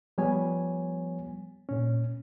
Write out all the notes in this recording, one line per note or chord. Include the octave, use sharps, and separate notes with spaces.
F3 G3 B3 C#5 G#5
A#2 C#4